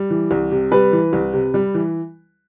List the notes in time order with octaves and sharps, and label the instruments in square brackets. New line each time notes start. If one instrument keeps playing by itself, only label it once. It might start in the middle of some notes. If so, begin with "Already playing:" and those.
Already playing: [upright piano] G3
E3
C2
C3
G3 B4
E3
C2
C3
G3
E3